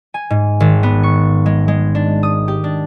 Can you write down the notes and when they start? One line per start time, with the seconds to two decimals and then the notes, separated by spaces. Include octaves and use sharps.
0.14 G#5
0.30 G#2
0.60 G#1
0.83 B3
1.03 C#6
1.46 G#3
1.68 G#3
1.95 D4
2.23 D#6
2.48 G4
2.64 D4